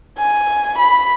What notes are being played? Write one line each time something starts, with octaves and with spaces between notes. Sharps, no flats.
G#5
B5